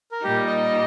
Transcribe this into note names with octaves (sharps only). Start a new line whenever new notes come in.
A#4
A#2 G3 D#4 G4
D#5